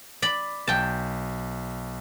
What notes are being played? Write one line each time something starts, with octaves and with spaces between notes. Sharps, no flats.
D5 B5 B6
B1 G5 A5